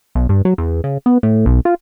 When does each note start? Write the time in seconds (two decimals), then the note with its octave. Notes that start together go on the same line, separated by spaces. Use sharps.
0.15 B1
0.29 G2
0.45 F#3
0.58 E2
0.84 C#3
1.06 B3
1.23 A2
1.46 B1
1.65 F4